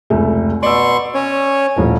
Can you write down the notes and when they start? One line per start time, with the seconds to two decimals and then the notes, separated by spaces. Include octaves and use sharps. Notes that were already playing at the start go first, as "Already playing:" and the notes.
0.10 F1 C#2 A3
0.63 B2 D5 C6 C#6 E6
1.15 C#4 C#5
1.76 D#1 A2 F3